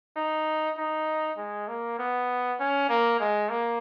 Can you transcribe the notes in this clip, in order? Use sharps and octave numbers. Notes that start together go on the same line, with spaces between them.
D#4
D#4
G#3
A#3
B3
C#4
A#3
G#3
A#3